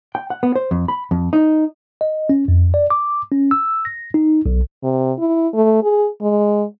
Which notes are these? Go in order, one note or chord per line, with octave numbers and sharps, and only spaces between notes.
G5
F#5
B3
C5
F2
B5
F2
D#4
D#5
C#4
F2
D5
D6
C#4
E6
A#6
D#4
B1
C3
E4
A3
G#4
G#3